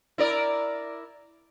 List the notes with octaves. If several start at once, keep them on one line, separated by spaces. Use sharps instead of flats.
E4 A#4 D5